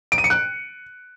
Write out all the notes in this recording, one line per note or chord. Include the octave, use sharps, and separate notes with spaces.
D7
D#7
C#7
F#6